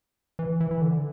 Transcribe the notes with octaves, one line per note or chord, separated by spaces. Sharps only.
E3
E3
E3
D3